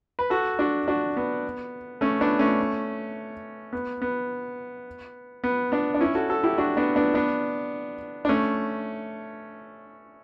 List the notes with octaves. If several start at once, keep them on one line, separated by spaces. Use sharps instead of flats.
B4
F#4 A4
D4 F#4
D4 F#4
B3
A3 C#4
B3 D4
A3 C#4
B3
B3
B3
B3 D4
D4
C#4 E4
F#4 A4
F#4 A4
E4 G4
D4 F#4
B3 D4
B3 D4
B3 D4
D4
A3 C#4